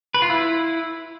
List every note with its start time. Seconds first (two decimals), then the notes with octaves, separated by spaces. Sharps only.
0.14 B4
0.22 F4
0.30 E4